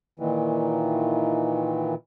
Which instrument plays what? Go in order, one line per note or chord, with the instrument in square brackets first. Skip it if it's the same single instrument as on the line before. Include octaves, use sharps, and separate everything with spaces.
[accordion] A#2 D#3 E3